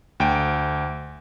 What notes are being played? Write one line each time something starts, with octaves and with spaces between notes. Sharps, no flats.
D2 G5 D7